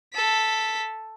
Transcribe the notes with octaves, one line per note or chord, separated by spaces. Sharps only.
A4 B6